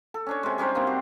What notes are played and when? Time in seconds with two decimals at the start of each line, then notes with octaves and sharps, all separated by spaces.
0.14 A4
0.26 C#4 D4 C#5
0.43 C3 G#3
0.58 G3 C#4 D#4 C5
0.75 C3 A#3 C4 D4
0.87 F#4 G4